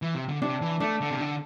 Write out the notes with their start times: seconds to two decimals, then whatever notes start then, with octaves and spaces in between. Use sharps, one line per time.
0.02 E3
0.15 C3
0.29 D3
0.42 C3 D4
0.61 E3
0.80 A3 D4
1.01 D3
1.11 C3
1.21 D3